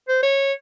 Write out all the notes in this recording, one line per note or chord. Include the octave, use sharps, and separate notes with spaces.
C5
C#5